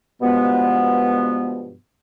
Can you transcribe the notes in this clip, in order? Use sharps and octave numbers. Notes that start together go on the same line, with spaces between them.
G2 B2 F3 G#3 B3